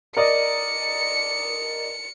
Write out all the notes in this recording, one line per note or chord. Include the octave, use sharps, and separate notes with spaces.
A#4 D5 D#5 C#7